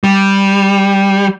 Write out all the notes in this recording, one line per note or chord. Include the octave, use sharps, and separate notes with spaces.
G3